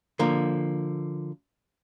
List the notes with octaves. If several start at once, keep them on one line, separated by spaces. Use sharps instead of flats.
D3 F3 A#3